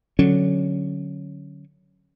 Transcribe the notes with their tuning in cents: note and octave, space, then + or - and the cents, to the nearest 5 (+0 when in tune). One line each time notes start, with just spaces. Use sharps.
D3 +0 F#3 +0 C#4 -5